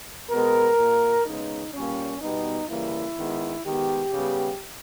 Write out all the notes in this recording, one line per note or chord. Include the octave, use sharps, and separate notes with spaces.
B2 G#3 B3 A#4
A#2 A#3
C#3 G#3 B3 D#4
A#2 G3 A#3 C#4
B2 G3 B3 D#4
C#3 E3 G3 A#3 E4
D#3 G#3 B3
D#3 G#3 B3 G4
C#3 G3 B3